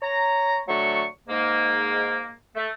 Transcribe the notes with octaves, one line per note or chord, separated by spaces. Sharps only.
C#5 A#5
D3 F#3 A3 C#6
G#2 A#3
A3